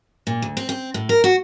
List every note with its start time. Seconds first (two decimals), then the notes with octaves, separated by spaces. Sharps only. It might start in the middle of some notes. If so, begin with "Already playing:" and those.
0.27 A#2
0.42 D2
0.57 C4
0.69 C4
0.94 A2
1.09 A#4
1.24 F#4